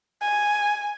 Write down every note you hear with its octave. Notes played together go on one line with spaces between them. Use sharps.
G#5